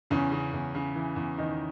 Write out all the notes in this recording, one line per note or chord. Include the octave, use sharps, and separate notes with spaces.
E2 C#3 C#4
C#3
E2
C#3
E3
E2
E2 D#3 D#4